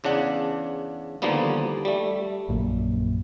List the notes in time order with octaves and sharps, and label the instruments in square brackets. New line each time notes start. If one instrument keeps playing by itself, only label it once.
[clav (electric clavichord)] E2 C#3 D4 F#5
D#2 D3 F3 G3 A#3 B3
G3 A3
[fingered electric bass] A#1 F#2 A#2